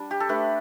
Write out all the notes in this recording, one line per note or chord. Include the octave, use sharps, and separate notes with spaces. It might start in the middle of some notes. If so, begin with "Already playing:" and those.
Already playing: G3 D4
G4
A4
A3 D4 B4